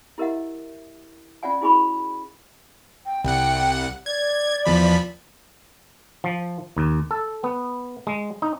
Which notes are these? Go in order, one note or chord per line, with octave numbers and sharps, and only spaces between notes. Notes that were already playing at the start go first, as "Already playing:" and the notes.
E4 G4 A#4 D#5 E5 F#5
C#4 F4 D5 F#5 G#5
E4 F#4 G#4 G#5 B5 C#6
G5
C2 F#5 G5
D5 G#6
E2 F3 B5
F3
D#2
A4
B3
G#3
D#4